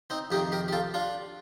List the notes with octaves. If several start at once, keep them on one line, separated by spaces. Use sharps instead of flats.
C4 D#4
F2 C3 D#3 D#4 G4
G4 A#4
G4
F4 A4
D4 F4